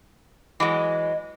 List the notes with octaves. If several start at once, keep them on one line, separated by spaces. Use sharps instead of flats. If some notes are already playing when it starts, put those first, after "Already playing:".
E3 F#3 G#3 D#5